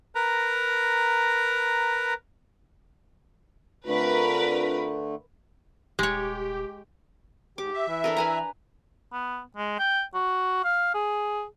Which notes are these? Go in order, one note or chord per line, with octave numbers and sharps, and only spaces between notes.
A#4 B4 A#5
D3 A3 C4 D4 F4 A#4 B4
D#1 G#3 G4 C#5
G#2 G4 D6
E5
E3
D4 A4 A#4
B4 G#5 A#5
B3
G#3
G5
F#4
F5
G#4